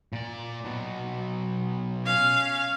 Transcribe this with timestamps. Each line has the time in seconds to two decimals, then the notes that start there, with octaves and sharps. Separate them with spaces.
0.13 A#2 D5
0.65 B2 F#3
2.04 C#4 F5